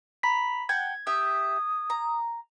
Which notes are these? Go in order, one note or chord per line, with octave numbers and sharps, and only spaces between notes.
A#5 B5 B6
F#5 G5 A5 G#6
G4 E5 D#6
A#5